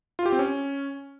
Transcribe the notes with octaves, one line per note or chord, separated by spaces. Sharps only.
F4
G4
C4
C#4